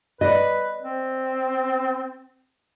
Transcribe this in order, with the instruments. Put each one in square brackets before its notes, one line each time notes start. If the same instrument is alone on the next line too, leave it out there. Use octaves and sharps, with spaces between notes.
[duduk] B4 [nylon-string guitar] D5 D#5
[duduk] C4